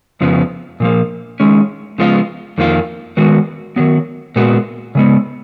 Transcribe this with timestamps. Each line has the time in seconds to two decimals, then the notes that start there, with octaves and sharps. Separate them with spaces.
0.21 F2 C#3 F3 B3
0.80 A#2 F3 A#3
1.40 D#3 G#3 C#4
1.98 C#3 F3 G#3 B3 F4
2.58 F2 D#3 A#3 F4
3.17 D#3 G#3 B3 F#4
3.76 D#3 F#3 B3
4.36 A#2 G#3 B3 F#4
4.95 C#3 G#3 B3